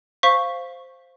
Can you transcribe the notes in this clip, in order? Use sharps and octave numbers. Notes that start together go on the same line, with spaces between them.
C5 F5 C#6 B6